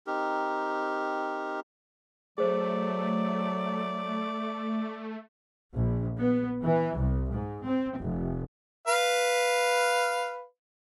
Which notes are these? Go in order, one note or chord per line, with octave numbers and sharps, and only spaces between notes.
C4 D#4 G4 A#4
F#3 A3 G#4 C5 D5
A#1
B3
E3
C2
G#2
C4
F1
B4 F5